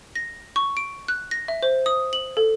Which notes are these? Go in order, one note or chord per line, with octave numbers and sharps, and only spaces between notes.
A#6
C#6
D7
F#6
A#6
E5
C5
D#6
F#7
A4